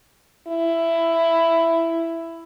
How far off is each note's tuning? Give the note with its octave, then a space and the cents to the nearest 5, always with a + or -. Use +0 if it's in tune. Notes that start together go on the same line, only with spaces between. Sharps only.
E4 +10